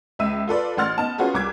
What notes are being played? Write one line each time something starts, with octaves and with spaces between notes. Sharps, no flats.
C#2 E5 E6 D#7
F4 A4 B4 D5
A1 F#5 C6 F6 A6
B3 D#4 A5
C#4 F4 F#4 G#4 B4
C2 D6 G#6